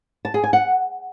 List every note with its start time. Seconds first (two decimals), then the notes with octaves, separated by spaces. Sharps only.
0.25 A5
0.34 G#4
0.44 G#5
0.53 F#5